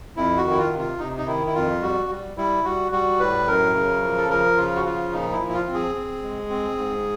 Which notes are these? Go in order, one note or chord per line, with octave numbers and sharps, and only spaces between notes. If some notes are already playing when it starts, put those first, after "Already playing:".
F2 E4
F#4
D#3
E4
F4
C3
F4
C3 D#4
D#4
D#3 E4
E4
F2 F4
G3 F#4
G3
G3 E4
G3 F#4
G3 F#4
A2 B4
F#2 A#4
C#3
F3
A4
F3 A#4
C#3 F4
F#4
F3 F4
A#2 D#4
E4
F3
E4
F4
C4
G#4
C4
G#3
C4
G#2